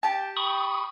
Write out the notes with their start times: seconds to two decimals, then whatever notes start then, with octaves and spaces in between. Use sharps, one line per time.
0.03 G4 A5
0.37 B5 C#6 D#6